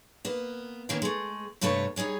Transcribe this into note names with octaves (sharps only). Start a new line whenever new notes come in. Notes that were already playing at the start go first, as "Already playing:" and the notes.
A#3 B3
D#3 A#3 B3 C#4
G#3 A3
G2 C3 A3 B4 C#5 A5
G3 D#4 G#4 C#5